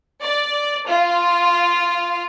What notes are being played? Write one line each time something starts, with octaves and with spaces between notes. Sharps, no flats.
D5
F4